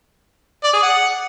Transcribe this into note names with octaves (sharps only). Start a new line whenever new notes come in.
D5
G#4
F#5